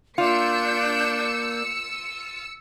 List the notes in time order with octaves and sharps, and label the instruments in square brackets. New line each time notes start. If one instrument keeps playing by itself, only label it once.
[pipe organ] A#3 [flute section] D4 G6 [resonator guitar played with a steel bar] F4 [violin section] E6 C#7